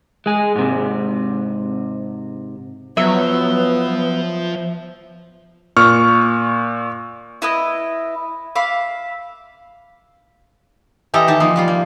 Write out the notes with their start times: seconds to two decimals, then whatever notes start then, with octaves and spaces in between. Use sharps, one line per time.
0.26 G#3 G#4
0.56 G#2 C3
2.97 F3 F#3 B3 E5
5.77 A#2 C#6 F6
7.42 E4 B4 D#5
8.56 E5 F5 B5 D6
11.14 E3 G4 A4 D#5 A#5
11.28 D#3 D#4 G4 A5
11.40 F3 A#3 D#4
11.56 F3 G3 F4
11.68 A#3